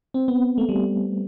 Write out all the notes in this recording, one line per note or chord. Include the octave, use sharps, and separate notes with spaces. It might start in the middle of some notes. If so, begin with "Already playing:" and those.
C4
B3
A3
G3